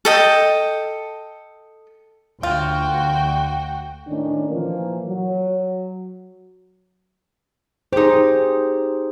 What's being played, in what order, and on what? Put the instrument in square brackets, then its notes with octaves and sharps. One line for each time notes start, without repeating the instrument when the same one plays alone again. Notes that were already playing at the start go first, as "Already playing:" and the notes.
[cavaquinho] A4 D#5 G5
[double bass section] D2 [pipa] F4 [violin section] F#4 G5
[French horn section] A2 D#3 C#4 D4
A#2 E3 F3 A#3
F#3
[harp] D#4 G4 [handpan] G#4 C5